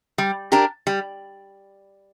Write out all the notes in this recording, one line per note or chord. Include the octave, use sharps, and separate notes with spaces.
G3
D4 G4 A#4
G3